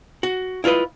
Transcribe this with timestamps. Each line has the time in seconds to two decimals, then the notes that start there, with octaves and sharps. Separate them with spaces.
0.23 F#4
0.64 E4 F4 A4 B4 D#5